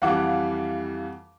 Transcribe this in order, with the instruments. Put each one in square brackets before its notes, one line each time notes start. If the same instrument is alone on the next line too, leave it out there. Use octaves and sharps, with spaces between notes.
[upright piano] F2 E3 G3 [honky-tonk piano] F5 F#5 D6